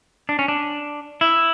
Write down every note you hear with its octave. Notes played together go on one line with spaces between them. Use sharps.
D4
C#4
D4
E4